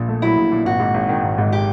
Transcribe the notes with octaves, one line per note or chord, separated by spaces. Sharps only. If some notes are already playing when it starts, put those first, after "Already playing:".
Already playing: A#1 A#2
A3
F#3 E4
A#1
A#2
G#1 F#4
G#2
G#1
D#3
G#1
G#2
G4